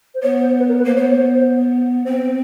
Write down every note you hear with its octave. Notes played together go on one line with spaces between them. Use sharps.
C5
B3 C#5
C5
B4
A#4
B4
A#3 C5
B3 C#5
C5
C#5
C5
C5
C4 C5
C5